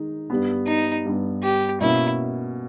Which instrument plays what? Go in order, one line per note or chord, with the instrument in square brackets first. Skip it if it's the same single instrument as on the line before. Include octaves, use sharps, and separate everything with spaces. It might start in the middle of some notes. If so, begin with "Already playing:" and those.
Already playing: [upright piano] D#3 G#3 D#4
G2 G3 B3
[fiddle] D#4
[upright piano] G2 G3 B3
[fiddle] G4
[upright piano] B2 A#3 C#4 [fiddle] E4